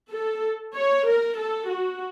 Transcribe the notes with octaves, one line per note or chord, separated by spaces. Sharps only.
A4
C#5
A#4
A4
F#4